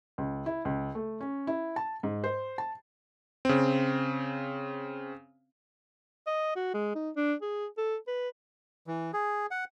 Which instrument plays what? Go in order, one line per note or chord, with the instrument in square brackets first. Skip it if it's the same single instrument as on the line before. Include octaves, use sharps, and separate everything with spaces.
[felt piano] C#2
E4
C#2
A3
C#4
E4
A5
G#2
C5
A5
[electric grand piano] C#3 C4
[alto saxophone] D#5
F#4
G#3
D#4
D4
G#4
A4
B4
[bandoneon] E3
G#4
F#5